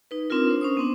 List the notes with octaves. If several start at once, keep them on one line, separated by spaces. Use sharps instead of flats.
D#4 B4
C4 D4 D#4 F4 A#4
D4 C5
C#4 C5 D#6
B3 C4 D4